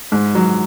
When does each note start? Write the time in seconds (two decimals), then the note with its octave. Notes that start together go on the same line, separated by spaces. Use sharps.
0.12 G#2
0.35 F#3